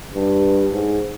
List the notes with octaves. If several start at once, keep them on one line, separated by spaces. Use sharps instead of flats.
G2
G#2